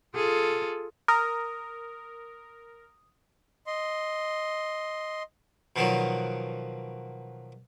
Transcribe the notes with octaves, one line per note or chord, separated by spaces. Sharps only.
F4 G#4 A4
A#4 D#6
D#5 C6
B2 D#3 F3 F#3